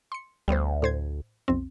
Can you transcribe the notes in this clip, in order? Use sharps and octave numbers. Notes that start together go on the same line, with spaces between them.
C6 C#7
D2 G3 B3 C5
A2 C5 G#6
B1 F2 C4